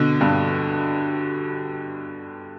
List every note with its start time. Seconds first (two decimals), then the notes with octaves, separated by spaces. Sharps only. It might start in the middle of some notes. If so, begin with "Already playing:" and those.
Already playing: B2 D3
0.21 G2